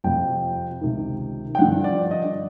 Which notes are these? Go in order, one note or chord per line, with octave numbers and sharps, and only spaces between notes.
F2 C3 F3 G5
C#2 C3 D#3
G5
G2 D3 F3 F#5
D5
D#5